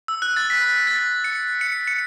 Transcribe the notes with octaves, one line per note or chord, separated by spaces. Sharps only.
E6
F#6
A6
B6
A6
C#7
C#7
C#7